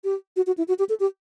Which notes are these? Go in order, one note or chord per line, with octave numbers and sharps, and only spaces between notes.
G4
F#4
F#4
E4
F#4
G4
A4
G4